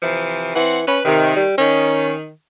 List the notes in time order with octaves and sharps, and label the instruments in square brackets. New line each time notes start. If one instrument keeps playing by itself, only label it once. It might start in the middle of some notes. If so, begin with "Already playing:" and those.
[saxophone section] C3 E3 F3
[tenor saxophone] E3 [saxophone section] C4 F#5
[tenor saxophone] C#4 [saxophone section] B4
[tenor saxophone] C3 [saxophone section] D#3
[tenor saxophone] G3
[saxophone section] D#3 [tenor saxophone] C#4